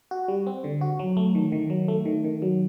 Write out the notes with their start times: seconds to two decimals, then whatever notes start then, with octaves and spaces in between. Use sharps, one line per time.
0.11 F#4
0.28 G3
0.47 C4
0.64 D3
0.81 F#4
0.99 F#3
1.17 A3
1.35 D#3
1.52 D#3
1.70 F#3
1.88 A3
2.05 D#3
2.24 D#3
2.42 F#3